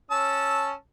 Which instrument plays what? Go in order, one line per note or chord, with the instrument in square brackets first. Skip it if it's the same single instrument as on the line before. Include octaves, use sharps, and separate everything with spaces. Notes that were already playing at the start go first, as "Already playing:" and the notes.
[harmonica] C#4 A5 E6